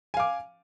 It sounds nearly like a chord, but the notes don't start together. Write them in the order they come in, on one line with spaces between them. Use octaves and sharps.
G#5 F5 D6